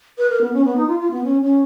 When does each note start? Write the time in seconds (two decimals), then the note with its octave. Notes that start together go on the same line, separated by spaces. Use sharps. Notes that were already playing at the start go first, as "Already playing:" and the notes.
0.18 B4
0.30 A#4
0.41 B3
0.53 C#4
0.65 B3
0.76 D#4
0.88 F4
0.99 F4
1.11 B3
1.24 C#4
1.41 C#4